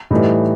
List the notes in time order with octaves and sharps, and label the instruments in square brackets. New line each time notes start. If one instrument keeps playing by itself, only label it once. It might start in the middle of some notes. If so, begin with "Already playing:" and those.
[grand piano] A2 [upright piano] E3 G3 D#4